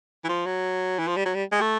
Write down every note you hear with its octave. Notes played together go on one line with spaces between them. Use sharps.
E3
F3
F#3
E3
F3
G3
F#3
G3
G#3
A3